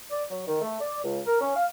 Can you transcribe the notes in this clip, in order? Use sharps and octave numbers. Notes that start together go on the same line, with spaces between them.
D5
F#3
D#3
A3
D5
C#2
A#4
C#4
F5